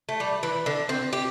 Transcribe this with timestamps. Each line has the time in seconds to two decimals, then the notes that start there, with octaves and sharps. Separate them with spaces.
0.09 A3
0.20 G3
0.43 E3
0.66 D3
0.89 C4
1.13 G4